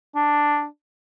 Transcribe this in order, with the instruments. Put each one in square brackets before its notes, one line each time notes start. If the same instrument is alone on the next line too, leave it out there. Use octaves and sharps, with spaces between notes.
[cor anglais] D4